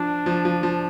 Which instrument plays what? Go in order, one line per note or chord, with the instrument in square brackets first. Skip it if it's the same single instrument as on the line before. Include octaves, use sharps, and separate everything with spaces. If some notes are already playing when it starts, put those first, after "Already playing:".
Already playing: [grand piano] F3 [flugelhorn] D4
[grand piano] F3
F3
F3